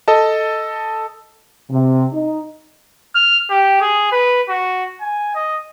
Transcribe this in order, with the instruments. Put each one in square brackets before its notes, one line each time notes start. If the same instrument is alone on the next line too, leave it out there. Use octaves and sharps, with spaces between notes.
[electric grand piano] A4 D#5 A5
[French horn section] C3
D#4
[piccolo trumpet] F6
G4
G#4
B4
F#4
G#5
D#5